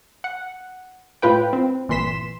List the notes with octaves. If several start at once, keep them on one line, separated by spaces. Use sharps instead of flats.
F#5
A2 F4 B4 G5
C4
G1 A#2 E3 C6 B6 E7